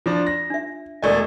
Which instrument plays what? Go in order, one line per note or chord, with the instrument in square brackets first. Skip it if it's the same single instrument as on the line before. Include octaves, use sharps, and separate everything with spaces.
[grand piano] F3 D4 [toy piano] F4
[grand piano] A#6
[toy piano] D4 E5
[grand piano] E1 A3 G#5 [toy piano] A#4 D5 D#5